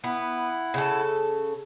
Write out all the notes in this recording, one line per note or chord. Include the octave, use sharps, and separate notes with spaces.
B3 E4 F#5
C#3 A4